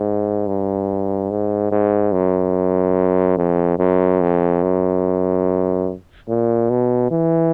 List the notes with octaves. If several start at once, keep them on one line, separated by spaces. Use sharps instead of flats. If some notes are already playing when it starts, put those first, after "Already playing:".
Already playing: G#2
G2
G#2
G#2
F#2
F2
F#2
F2
F#2
A#2
B2
E3